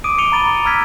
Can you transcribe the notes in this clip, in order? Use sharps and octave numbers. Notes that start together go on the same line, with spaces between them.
D6 D#6 D7 D#7
D6 C#7 D#7 F7 G7
A#5 B5 A6 D#7 F7 G7
A#5 E6 F6 G#6 B6